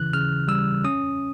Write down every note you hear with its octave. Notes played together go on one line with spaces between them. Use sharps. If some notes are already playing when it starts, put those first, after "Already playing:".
Already playing: C#3 E3 F#6
C#3 F6
G3 E6
C#4 D#6